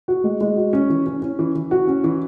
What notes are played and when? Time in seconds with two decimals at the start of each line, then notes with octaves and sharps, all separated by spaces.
0.08 F#4
0.24 G#3
0.41 G#3
0.57 F#4
0.73 C#4
0.90 E3
1.06 C#4
1.22 C#4
1.39 E3
1.55 E3
1.71 F#4
1.87 C#4
2.04 E3